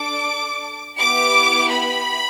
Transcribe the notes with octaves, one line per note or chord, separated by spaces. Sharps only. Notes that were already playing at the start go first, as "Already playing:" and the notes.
Already playing: D4 A4 D6
B3 E4 G4 D6
B5